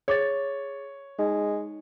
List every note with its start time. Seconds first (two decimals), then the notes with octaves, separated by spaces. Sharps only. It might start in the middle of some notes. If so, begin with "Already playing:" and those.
0.08 G#4 C#5 D6 A6
1.19 G#3 D#4